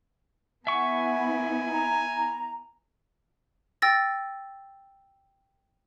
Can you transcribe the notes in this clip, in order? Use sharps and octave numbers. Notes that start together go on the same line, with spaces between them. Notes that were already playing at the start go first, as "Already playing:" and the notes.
B3 E4 E5 F#5 G#5 C#6
A#5
G5 E6 A6 A#6